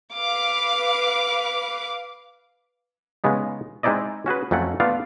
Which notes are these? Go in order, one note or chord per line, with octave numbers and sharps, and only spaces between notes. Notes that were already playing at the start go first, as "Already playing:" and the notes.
B4 F5 D6
C#3 G#3 B3 D#4
G#3 C4 D#4 E4 D5 D#5
C#4 F#4 G#4 B4
F2 F#3 A3 C#4 F#5
A3 B3 F4 D5 F5